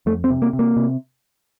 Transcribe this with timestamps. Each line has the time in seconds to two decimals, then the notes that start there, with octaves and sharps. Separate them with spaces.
0.06 F2 A3
0.24 C4
0.30 C3
0.42 A#3
0.53 C3
0.59 A#3
0.77 C3